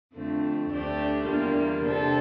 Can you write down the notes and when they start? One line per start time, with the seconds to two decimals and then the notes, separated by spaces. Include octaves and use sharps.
0.13 F2 D3 A3 C4
0.70 D2 D3 A3 D4 G4
1.27 E2 D3 G3 A#3 F4
1.85 C3 G3 D4 A4